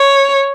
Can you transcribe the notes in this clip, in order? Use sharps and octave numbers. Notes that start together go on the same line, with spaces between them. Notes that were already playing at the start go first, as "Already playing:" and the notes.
Already playing: C#5